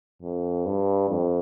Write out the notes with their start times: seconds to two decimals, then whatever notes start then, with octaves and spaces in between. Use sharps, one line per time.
0.22 F2
0.66 G2
1.10 F2